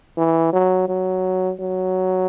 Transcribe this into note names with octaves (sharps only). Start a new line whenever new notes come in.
E3
F#3
F#3
F#3